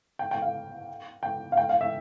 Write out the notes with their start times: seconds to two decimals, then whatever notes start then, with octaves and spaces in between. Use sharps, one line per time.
0.19 G5
0.31 G5
0.42 F5
1.23 G5
1.52 F5
1.57 G5
1.69 F5
1.81 E5